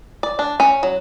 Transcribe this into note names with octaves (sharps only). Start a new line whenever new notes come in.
D5
D4
C#4
F#3